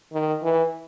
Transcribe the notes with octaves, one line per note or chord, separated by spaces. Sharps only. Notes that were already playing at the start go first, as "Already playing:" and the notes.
D#3
E3